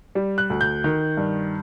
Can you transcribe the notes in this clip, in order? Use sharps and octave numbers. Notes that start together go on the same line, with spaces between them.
G3
F#6
D2
G6
D#3
G2